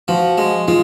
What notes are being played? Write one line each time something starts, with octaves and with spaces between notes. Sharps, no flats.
F3 F#4
G#3
G#3 F4